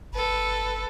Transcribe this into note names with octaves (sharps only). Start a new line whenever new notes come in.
G1 A4 B4